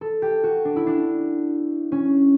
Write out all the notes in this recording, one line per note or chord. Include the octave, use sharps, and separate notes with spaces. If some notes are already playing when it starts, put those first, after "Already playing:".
A4
G4
F#4
D4
E4
D4
C#4